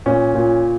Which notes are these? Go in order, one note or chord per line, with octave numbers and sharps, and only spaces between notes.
A#2 C#4
A#2